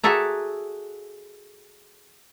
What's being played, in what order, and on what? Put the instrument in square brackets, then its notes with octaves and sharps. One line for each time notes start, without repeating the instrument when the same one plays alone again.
[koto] F#4 G#4 A4 D5 E5 A#5